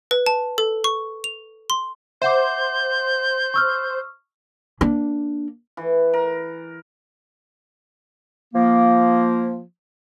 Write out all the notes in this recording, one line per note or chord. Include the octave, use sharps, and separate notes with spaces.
B4
A5
A4
C#6
F7
C6
C5 E5 F#5 D6 G6
C#6 E6 F6
A#3 D4
E3
A#4
F3 A#3